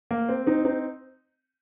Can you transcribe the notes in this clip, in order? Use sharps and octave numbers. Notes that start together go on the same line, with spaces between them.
A#3
C4
C4 D#4
C4 D#4